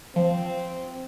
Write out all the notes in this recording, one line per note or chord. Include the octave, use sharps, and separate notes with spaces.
F3 C4